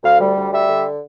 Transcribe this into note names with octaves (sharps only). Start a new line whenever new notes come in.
D2 F5
G3
D2
G3 E5
D3